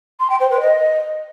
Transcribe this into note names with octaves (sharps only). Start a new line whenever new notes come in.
C6
G5
C5
B4
D#5